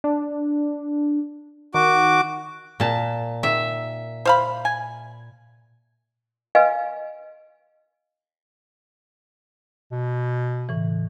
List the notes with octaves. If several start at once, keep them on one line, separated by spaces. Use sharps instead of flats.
D4
D#3 F#4 D6
A#2 A5
D#3 E5
C5 F5 B5
G#5
B4 D#5 F5 G#5
B2
A2 C#3 E3